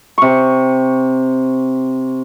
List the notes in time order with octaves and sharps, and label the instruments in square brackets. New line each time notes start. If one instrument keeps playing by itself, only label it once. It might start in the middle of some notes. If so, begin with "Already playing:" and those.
[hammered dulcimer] C3 C#6